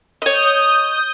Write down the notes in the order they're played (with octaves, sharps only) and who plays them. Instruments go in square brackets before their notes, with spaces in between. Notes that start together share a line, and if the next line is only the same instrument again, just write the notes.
[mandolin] C#5 D#5 [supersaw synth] D#6 G6